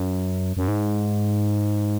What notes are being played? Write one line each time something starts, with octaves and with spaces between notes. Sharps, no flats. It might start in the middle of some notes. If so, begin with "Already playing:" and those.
Already playing: F#2
F#2
G#2